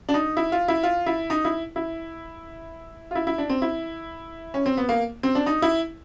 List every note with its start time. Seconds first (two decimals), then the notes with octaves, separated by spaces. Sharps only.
0.09 D4
0.14 D#4
0.37 E4
0.52 F4
0.68 E4
0.83 F4
1.06 E4
1.30 D#4
1.45 E4
1.76 E4
3.11 F4
3.15 E4
3.27 E4
3.38 D4
3.49 C4
3.62 E4
4.54 C#4
4.66 C4
4.77 B3
4.89 A#3
5.23 C4
5.35 D4
5.46 D#4
5.62 E4